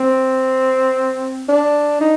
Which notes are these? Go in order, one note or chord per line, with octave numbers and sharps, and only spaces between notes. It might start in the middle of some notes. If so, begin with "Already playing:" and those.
Already playing: C4
D4
D#4